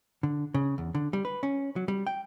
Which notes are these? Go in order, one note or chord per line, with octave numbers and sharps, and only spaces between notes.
D3
C#3
E2
D3
G3
B4
C#4
F#3
G3
G5